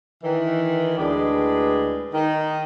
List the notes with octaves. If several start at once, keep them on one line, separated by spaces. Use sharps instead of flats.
D#3 E3
D2 A2 G#3 D4 B4 D5
D#3 D#4